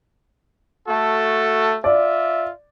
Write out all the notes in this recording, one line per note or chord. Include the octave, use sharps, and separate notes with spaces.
A3 F#4 A4
F4 D5 E5